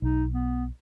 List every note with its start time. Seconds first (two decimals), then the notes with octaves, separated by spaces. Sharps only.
0.02 B1 D#4
0.33 B3